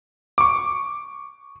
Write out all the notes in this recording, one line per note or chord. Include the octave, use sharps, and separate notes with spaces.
C#6 D6